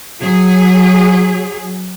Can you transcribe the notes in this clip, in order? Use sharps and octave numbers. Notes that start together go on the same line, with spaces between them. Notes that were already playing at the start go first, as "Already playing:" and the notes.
F#3 G#4